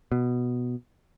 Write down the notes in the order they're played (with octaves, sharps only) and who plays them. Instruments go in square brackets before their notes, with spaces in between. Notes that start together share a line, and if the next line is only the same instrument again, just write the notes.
[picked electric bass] B2